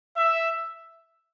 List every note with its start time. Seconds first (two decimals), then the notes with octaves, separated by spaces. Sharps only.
0.17 E5